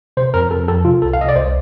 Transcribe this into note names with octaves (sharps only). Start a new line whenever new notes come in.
C3 C5
F2 A#4
F2 A4
F3 A4
C3 F4
C2 A4
F5
C3 D#5
D5
C2 C5